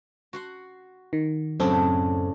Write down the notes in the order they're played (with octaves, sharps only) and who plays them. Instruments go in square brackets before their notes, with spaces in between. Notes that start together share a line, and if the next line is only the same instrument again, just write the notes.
[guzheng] F#4 F#5 C6
[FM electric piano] D#3
[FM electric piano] F#2 C4 A4 [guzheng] A2 C#3 D4